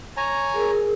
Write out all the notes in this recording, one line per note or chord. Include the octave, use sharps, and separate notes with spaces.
C#5 G#5 A#5
G#4 A#4